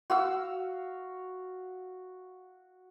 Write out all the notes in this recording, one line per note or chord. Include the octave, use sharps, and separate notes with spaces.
F#4 F5 E6